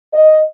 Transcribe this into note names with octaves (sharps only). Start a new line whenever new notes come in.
D#5